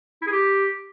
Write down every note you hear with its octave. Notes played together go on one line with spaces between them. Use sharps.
E4
G#4
G4